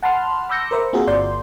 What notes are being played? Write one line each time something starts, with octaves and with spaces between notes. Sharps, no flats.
F#5 A5 B5 C6 F6
B5 D6 E6 G6 A#6 C#7
A#4 C5 E5
A#3 C4 F4 F#4 G#4 A#4
G1 D5 C6 G6